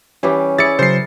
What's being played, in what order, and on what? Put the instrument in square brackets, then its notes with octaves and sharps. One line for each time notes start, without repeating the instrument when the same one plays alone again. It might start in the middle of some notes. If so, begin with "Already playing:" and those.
[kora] E3 G3 G4 [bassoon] C#4
[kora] E4 G#4 D5 [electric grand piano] A6 C#7
[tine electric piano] C#3 F#3 [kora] A#4 [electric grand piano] C5 C7